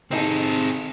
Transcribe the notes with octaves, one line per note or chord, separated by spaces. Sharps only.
C3 C4 D#4 G#4 A4